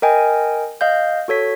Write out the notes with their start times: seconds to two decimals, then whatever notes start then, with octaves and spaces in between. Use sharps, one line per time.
0.02 A#4 D#5 G5 G#5
0.81 D#5 F5 G6
1.28 F#4 A4 C#5 B6